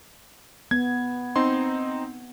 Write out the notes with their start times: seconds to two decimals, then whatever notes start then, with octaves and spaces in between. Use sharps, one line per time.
0.71 B3 G#6
1.36 C4 D#4 C6